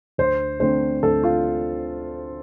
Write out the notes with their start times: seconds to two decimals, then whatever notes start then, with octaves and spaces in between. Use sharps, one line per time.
0.18 D2 C5
0.60 D3 A3 C4 C5
1.03 D2 A4
1.23 F4